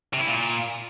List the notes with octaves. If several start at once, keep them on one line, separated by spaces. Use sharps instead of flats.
C3
E4
A#2